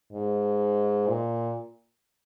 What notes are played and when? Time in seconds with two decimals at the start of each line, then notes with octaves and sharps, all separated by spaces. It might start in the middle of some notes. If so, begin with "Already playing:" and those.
0.13 G#2
1.08 A#2